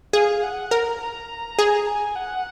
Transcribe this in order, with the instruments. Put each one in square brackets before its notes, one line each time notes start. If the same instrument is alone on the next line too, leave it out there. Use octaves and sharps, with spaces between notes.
[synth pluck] G#4 [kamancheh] F5
[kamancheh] F#5
[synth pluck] A#4 [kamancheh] A#5
[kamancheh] A#5
[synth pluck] G#4
[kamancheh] G#5
F#5